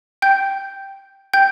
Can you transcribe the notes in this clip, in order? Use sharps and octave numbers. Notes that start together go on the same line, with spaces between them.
G5 G6
G5 G6